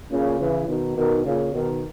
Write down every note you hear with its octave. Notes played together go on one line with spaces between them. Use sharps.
A#2 C#3
C#3 E3
B2 D#3
B2 D#3
A#2 C#3
B2 D#3